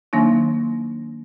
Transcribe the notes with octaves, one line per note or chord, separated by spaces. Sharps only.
D#3 F#3 A#3 D4 D#4